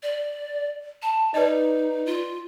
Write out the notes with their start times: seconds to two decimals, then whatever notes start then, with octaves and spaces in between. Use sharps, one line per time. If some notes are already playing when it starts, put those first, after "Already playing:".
0.03 D5
1.02 A5
1.34 D#4 B4 D5 D#5
2.06 F4